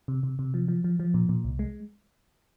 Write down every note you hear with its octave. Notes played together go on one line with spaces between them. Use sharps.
C3
C3
C3
F3
F3
F3
F3
A#2
A#2
C2
G#3